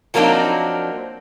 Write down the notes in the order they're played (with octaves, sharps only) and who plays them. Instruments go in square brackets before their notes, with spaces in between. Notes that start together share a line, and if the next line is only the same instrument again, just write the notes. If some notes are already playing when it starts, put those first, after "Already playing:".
[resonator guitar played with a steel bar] F3 F#3 A#3 C4 D4 D#4